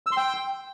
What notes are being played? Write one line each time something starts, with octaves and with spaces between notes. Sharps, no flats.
E6
C6
G5